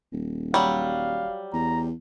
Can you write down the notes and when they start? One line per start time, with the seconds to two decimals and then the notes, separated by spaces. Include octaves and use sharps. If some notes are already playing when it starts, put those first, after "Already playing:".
0.13 D#1
0.54 F#3 G3 F5
1.53 E2 A#5